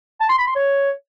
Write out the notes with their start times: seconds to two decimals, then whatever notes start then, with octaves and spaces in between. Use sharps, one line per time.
0.20 A5
0.29 C6
0.38 B5
0.47 C6
0.56 C#5